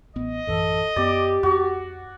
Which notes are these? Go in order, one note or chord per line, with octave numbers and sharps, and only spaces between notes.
A1 B3 D#5
A1 F#2 E3 A4
F#2 B3 G4 D5
F2 F#4